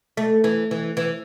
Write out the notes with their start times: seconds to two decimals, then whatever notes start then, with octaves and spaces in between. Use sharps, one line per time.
0.17 A3
0.44 E3
0.71 E3
0.97 E3